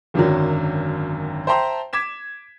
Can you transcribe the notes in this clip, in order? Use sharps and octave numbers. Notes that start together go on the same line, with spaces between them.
G#1 F#2 D3 D#3 F#3
C5 E5 G5 A5 A#5 C6
D6 G#6 B6 E7